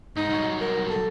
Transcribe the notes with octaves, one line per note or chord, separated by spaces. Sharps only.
G#2 D#4
C2 F#3
A#4
A4